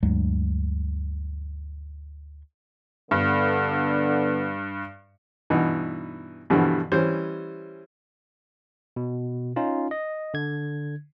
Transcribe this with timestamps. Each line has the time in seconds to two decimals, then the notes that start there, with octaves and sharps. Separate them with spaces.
0.03 D2 G2 F#3 G#3
3.11 G2 D3 B3
5.50 G2 B2 E3 D#4
6.50 G2 B2 D3 E3 F3 G3
6.92 E3 G3 C#4 C5
8.96 B2
9.56 C#4 D#4 F4
9.91 D#5
10.34 D3 G#6